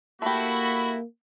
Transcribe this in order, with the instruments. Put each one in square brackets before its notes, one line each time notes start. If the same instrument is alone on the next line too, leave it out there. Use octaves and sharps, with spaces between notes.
[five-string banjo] A3 G4 [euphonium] A#3 [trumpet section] E4 F#4 [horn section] B5